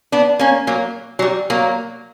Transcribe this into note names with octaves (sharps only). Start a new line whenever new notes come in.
B3 D4
A#3 C#4
F#3 A#3
F#3
G3
F#3 A#3